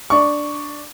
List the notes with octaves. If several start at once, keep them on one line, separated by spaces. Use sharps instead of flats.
D4 C#6